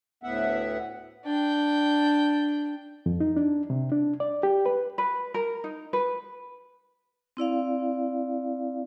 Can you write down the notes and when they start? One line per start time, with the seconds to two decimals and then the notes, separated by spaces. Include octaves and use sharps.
0.23 D2 A2 B3 E5 F#5
1.25 D4 G5
3.06 F2
3.20 D#4
3.36 D4
3.70 C3
3.92 D4
4.20 D5
4.43 G4
4.66 B4
4.98 B4
5.34 A#4
5.64 D#4
5.93 B4
7.37 C4 E4 D5 F5